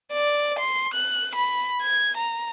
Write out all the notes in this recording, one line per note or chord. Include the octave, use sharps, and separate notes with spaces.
D5
C6
F#6
B5
G#6
A#5